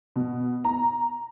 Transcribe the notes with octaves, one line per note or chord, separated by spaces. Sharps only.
B2
A#5